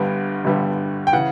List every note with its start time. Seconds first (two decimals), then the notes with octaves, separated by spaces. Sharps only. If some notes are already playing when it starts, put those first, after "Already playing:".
Already playing: G1 G2 D3 G3 B3
0.44 G1 G2 D3 G3 B3
1.07 G5
1.13 C#3 E3 F#5